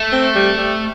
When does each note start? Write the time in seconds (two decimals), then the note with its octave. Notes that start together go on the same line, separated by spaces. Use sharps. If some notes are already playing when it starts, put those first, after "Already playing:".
Already playing: A3
0.12 C4
0.35 G3
0.57 G3